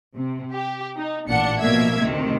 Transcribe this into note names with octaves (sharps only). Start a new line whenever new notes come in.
C3
G4
D#4
A1 A#2 D4 F#5 C#7
B2 F3 A#3 E5 G#6
D2 C3 D#3